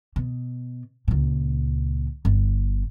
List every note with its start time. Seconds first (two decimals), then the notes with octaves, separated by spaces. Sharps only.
0.16 B2
1.08 C#2 A#2
2.25 G1